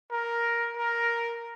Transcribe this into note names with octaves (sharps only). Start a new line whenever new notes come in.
A#4
A#4